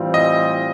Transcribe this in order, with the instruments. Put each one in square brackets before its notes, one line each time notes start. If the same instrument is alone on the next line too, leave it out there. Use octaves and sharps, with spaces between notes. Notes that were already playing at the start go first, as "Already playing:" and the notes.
Already playing: [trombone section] A2 E3 G3 C4 F4
[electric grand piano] D#5